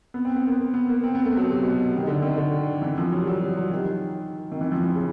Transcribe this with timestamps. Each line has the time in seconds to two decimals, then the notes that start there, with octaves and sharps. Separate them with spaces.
0.14 B3
0.25 C4
0.36 B3
0.47 A#3
0.74 B3
0.89 A#3
1.04 C4
1.15 B3
1.25 A3
1.37 F#3
1.49 C3
1.63 B2
1.97 D#3
2.07 D3
2.22 D#3
2.37 D3
2.82 E3
2.98 F3
3.12 F#3
3.22 G3
3.27 F#3
3.42 G3
3.57 F#3
3.71 D#3
4.52 D#3
4.61 E3
4.72 F3
4.84 E3
4.95 C#3